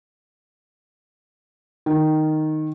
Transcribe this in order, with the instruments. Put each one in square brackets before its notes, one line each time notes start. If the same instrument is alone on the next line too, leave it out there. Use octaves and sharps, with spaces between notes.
[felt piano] D#3